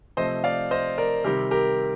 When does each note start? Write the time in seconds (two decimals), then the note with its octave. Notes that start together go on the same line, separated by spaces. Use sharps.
0.17 C3 F3 A3 C4 C5 D#5
0.44 D5 F5
0.71 C5 D#5
0.98 A#4 D5
1.24 C3 D#3 G3 C4 G4 A#4
1.51 G4 A#4